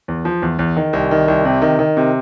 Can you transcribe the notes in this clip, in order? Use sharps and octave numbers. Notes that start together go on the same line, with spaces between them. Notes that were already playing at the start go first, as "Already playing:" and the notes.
E2
F3
E2
E2
D#3
C2
D#3
C2
C3
D#3
D#3
C3